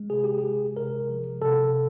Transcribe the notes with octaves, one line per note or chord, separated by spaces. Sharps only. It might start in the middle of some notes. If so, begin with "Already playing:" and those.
Already playing: G#3
C3 G#4
G4
G#4
G#3
C3 A#4
F3
C3 A4